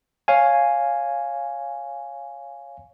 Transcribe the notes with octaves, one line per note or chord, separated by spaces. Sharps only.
C#5 F5 G#5